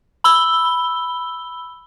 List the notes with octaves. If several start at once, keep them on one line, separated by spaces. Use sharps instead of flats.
B5 E6 G7